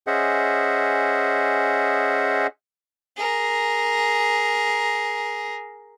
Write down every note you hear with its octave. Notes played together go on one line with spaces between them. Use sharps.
C#4 G#4 C5 D#5 E5 F#5
G#4 A#4